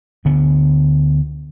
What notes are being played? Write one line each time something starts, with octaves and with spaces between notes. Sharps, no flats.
D2 D3 B3